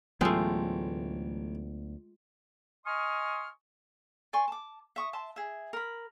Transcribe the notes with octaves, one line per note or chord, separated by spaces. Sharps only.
A1 D2 F#3 G#3 A3 B3 F4 G5
D#5 G#5 C6 C#6 D#6 F6
D5 G#5 C6 C#6
A5 D6
E5 C#6 D#6
E5 A5 C6
G#4 E5
A#4 B5